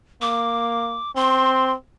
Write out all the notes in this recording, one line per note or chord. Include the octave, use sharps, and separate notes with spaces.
A#3 D6
C4 C6